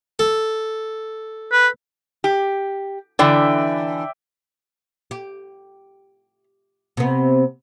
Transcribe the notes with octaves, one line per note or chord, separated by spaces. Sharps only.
A4
B4
G4
D3 E3 D5 E5 G5
G4
C3 B3